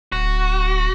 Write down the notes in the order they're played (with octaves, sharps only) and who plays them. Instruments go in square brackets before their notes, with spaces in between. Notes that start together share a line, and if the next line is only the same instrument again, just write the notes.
[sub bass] D1 [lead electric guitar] F#4